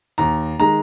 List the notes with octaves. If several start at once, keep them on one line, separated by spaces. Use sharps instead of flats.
D#2 A#5
D#3 G#3 A#5